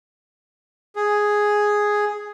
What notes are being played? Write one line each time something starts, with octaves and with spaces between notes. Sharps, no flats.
G#4